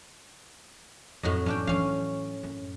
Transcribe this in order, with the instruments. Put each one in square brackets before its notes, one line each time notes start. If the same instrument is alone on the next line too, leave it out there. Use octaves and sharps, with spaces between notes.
[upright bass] F2 [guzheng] A2 F#3 D#5
[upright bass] E3 [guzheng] C#4 D4 G5
[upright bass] E3 F#3 [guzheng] C#4 F5
[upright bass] F#2